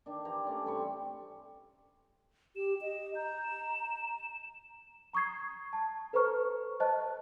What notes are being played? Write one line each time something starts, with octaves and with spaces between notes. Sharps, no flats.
D#3 D4
E3 G4 C5 A#5
A3 C#4 D5
G2 C4 B5 C#6
G4 E7
D#5
A#5 G6
E7
A#5 C#6 D#6 G#6 C7
A5
A4 B4 C5 A#5 C#6 F6
C5 D#5 A5 F#6